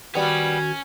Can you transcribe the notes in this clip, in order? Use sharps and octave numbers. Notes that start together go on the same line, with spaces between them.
D#3 G3 B3 C#4 F#4 G#6